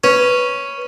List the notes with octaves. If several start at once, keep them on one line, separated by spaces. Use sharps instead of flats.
C#4 B4